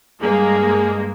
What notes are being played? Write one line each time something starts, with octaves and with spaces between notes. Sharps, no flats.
G2 G#3 A#3 G#4